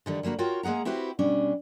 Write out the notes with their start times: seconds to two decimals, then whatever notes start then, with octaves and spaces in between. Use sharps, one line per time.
0.06 D3 D#3 G3
0.23 D3 G3 A#3 F#4 A#4
0.38 F4 F#4 A#4 C#5 G5
0.63 G#3 A#3 G#4 F#5 A#5
0.85 C4 E4 F#4 G4 B4 C5
1.19 B2 G3 C#4 D4